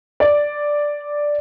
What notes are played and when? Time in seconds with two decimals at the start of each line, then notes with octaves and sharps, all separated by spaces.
0.20 D5